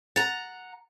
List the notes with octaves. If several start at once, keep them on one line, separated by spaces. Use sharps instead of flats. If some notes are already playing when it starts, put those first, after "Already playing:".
F#5 A#5 A6